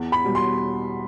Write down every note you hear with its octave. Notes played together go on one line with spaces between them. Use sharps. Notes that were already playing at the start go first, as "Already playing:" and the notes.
Already playing: E2
B5
B2 G3
C6